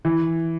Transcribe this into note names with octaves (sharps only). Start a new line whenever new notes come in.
E3